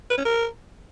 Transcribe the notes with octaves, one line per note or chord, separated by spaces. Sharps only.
B4
C#4
A#4